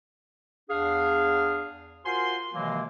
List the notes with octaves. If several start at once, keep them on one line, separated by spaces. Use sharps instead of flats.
E2 D4 G#4 F5
F4 F#4 A#4 C5 G#5 C6
C3 D#3 E3 F#3 G#3 A#3